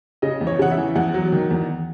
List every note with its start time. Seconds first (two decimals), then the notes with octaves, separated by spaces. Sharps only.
0.22 C#3 D#5
0.41 E2
0.47 C#5
0.59 C#3 F#5
0.71 E5
0.77 E3
0.95 E2 F#5
1.14 F#3
1.32 D#3
1.51 E2